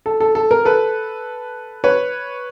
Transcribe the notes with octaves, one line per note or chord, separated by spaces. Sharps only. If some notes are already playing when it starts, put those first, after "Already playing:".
A4
A4
A4
A#4
A4 B4
B4 C#5